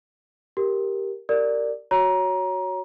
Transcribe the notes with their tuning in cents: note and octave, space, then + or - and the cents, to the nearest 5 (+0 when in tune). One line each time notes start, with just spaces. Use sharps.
G4 +0 A#4 +0
G4 +0 A#4 -20 D5 +0
F#4 +0 C#5 +0 A#5 +20